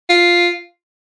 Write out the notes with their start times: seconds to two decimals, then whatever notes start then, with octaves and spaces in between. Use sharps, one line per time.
0.09 F4